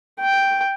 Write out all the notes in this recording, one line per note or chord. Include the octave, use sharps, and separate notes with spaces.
G5